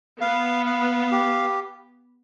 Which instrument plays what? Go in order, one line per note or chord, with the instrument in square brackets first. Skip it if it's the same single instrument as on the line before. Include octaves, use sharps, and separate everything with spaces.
[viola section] B3 [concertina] F5
[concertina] F5
G4